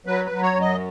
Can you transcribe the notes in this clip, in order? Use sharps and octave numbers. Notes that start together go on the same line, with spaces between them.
F#3 B4
B4
F#3
C#5
F#2
D#5